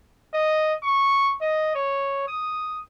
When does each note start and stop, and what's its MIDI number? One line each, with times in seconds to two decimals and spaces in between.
0.34 0.74 75
0.83 1.35 85
1.41 1.71 75
1.75 2.23 73
2.28 2.80 87